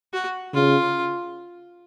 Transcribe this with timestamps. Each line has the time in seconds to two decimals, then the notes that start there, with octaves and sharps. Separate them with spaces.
0.14 F#4
0.54 C#3 F4